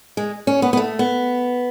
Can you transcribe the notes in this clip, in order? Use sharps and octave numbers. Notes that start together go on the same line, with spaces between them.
G#3
C#4
B3
B3
A3
B3